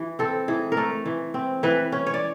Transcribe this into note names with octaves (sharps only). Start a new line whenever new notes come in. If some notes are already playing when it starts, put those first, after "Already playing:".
Already playing: E3
C4 A4
E3 G#4
A#4
A3 A4
E3
C4
E3 B4
C#4
C#5
D5